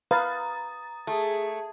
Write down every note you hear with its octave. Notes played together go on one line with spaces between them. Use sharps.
B4 F5 A#5 D#6 A6
A3 G#4